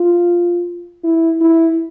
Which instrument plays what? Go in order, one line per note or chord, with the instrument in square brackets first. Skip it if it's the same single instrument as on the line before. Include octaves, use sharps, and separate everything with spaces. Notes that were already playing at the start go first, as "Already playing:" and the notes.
Already playing: [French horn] F4
E4
E4